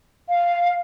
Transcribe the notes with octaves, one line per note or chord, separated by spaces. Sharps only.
F5